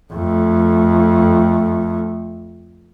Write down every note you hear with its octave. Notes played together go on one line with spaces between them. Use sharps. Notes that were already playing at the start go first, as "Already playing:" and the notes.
F2 A3